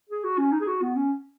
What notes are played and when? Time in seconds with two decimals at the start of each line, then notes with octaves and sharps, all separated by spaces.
0.09 G#4
0.24 F#4
0.38 C#4
0.52 D#4
0.60 G#4
0.67 F#4
0.82 B3
0.96 C#4